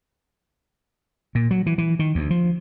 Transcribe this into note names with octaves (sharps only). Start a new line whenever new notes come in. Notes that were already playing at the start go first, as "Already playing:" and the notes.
A#2
F#3
E3
E3
D#3
D2
F3